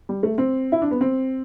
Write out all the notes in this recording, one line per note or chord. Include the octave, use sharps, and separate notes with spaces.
G3
A3
C4
E4
D4
B3
C4